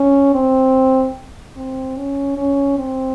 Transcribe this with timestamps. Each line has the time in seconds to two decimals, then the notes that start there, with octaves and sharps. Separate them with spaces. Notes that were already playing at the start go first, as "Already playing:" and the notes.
Already playing: C#4
0.34 C4
1.56 C4
1.97 C#4
2.37 C#4
2.78 C4